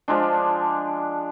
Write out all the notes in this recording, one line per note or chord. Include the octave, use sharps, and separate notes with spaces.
F3 G#3 D4